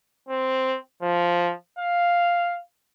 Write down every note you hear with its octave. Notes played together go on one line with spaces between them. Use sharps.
C4
F3
F5